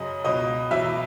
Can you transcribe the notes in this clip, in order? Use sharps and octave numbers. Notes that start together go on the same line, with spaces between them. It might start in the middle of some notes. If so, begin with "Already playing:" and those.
Already playing: F#2 C#3 F#3 D#5
C#2 B2 F#3 D#5
E2 B2 F#3 E5